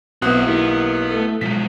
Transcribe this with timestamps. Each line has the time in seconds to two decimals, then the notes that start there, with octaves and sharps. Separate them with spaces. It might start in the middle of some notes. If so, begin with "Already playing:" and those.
0.22 B1 B3 C4 E4 F#4 D#6 F#6
0.47 A#3 B3 E4 G4 A#4
1.11 A3 A4
1.41 B2 F3 F#3 G#3 F4 B6